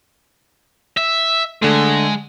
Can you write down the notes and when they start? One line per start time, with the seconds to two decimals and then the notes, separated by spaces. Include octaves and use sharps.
0.97 E5
1.62 D3 G#3 A3